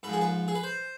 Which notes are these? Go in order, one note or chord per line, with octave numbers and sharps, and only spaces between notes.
G#2 F3 G#4 B4
B4
G#4
B4
C5